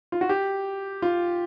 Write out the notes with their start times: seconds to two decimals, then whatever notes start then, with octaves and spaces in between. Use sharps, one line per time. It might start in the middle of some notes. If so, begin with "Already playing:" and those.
0.12 F4
0.21 F#4
0.29 G4
1.02 F4